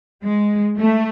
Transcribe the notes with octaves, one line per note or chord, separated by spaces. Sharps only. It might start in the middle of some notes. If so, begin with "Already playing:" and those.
G#3
A3